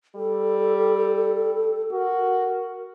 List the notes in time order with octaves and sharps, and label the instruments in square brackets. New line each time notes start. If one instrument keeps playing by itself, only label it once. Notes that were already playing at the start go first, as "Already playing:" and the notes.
[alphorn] G3 [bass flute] A4
[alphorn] F#4 [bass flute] A#4